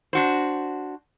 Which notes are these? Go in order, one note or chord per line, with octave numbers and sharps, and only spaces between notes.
D4 F#4 C5